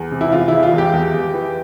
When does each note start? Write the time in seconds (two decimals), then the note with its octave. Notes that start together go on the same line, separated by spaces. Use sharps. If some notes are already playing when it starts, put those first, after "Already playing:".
Already playing: E2
0.11 C3
0.21 E4
0.32 E2 F4
0.48 E1 E4
0.63 F4
0.73 E2 G4
0.93 E2
1.14 E2
1.34 E3